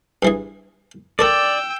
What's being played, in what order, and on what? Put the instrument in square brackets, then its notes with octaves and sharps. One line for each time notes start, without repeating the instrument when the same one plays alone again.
[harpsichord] G2 E3 G#4
[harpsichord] A4 A#4 A5 [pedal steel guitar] D5 [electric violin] G5 E6